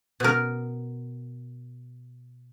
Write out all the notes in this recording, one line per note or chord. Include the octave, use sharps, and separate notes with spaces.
B2 A#4